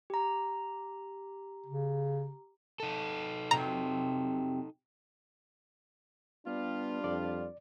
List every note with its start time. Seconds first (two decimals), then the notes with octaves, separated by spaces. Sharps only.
0.10 G4 A#5
1.67 C#3
2.80 D#4 A4
3.51 F2 C3 F#3 A#5
6.47 G3 B3 D4 F4
7.04 F2 D5